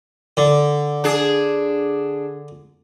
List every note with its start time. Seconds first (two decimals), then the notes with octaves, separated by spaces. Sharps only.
0.37 D3
1.04 D4 G#4